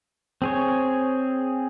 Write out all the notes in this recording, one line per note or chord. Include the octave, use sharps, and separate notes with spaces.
C4 G#4 C#5